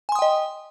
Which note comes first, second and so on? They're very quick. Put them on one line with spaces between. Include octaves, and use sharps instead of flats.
G#5 C6 D#6 G5 D#5